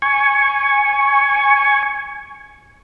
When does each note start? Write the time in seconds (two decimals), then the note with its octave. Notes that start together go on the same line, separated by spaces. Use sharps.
0.02 G#5 C#6